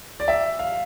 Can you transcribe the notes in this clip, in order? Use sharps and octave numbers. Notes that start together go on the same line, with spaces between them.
D5
E5
F5